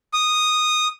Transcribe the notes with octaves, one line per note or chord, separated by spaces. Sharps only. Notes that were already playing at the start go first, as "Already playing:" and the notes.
D#6